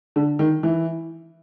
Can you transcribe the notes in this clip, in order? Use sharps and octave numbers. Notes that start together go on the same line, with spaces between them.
D3
D#3
E3